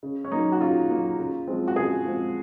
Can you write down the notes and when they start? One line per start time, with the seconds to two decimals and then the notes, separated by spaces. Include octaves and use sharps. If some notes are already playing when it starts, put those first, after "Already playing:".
0.03 C#3
0.24 C#4
0.32 F#3 A#3 D#4
0.52 F#4
0.61 C#3 F4
0.89 F#3 A#3
1.18 C#3
1.48 F3 G#3 C4
1.68 F#4
1.76 C#3 G#4
2.05 F3 G#3 C4